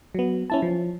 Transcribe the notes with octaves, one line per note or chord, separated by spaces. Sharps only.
F#3 B3
C#4 E4 A5
F3